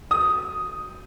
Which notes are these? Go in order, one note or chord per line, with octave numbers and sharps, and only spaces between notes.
D#6